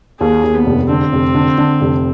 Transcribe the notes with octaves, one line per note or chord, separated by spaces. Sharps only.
D#2 G#4
D#2
B3
F1
D3 C4
F1
D3
D3
F1